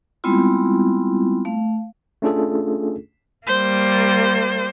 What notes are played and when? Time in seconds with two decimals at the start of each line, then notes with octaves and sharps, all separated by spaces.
0.24 G3 G#3 B3 C4 E4 F4
1.45 A3 F5
2.22 A3 C#4 D4 F4 G#4 A4
3.47 G3 A#3 C5